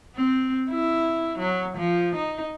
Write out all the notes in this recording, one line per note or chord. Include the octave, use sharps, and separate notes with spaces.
C4
E4
F#3
F3
D#4